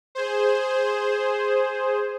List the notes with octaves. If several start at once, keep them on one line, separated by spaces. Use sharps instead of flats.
G#4 C5